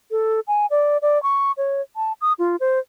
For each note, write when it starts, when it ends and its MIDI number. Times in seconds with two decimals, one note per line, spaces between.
0.11 0.40 69
0.48 0.66 80
0.71 0.98 74
1.02 1.21 74
1.23 1.52 85
1.57 1.81 73
1.96 2.13 81
2.21 2.33 87
2.39 2.56 65
2.60 2.79 72